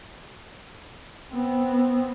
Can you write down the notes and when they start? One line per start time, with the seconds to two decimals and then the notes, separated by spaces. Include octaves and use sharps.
1.32 B3 C4